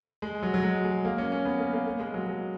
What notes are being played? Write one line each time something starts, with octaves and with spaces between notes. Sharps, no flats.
G#3
F#3
F#3
G#3
G#3
A#3
C#4
C#4
B3
A#3
A#3
A#3
G#3
F#3
G#3